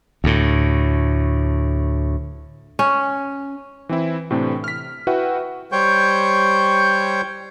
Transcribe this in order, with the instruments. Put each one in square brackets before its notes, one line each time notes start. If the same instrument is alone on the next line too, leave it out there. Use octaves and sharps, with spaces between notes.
[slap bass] D2 A2
[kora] C#4
[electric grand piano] E3 C4 E4
A2 C3 E3 A3 C4 D4
F6 B6
E4 F#4 B4 E5 F#5 G5
[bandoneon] G3 C5 C#5 G5 C#6 G6